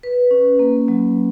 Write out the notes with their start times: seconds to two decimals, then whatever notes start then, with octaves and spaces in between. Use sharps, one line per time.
0.03 B4
0.31 C#4
0.59 A#3
0.88 F#3